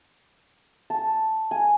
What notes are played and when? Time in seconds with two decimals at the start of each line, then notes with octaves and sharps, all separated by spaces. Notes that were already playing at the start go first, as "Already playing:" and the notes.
0.90 A5
1.51 G#5